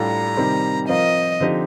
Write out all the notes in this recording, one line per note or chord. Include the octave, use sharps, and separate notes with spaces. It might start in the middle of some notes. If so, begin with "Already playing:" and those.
Already playing: A2 G3 D4 F4 A4 A#5
C3 D#3 G3 C4
F3 C4 F4 A#4 D#5
D3 F3 C4 D#4 G4